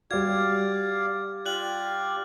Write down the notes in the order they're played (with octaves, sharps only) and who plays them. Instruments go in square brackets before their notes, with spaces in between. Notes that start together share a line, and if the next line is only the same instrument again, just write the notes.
[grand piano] G3 F#4 [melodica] D5 F5 [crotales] G#6
[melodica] F4 G4 D5 [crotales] F#6 F#7